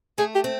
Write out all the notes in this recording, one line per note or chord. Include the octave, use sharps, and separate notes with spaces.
A3 G#4
G4
C4